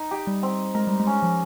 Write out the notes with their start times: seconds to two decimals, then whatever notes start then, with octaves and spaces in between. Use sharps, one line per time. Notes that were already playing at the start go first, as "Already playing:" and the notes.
Already playing: D#4
0.11 G4
0.27 G3
0.43 C4
0.74 G#3 A#4
0.87 G3
1.00 G#3
1.07 C#4
1.23 F3